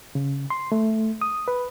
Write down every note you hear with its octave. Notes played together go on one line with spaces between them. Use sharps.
C#3
C6
A3
D#6
B4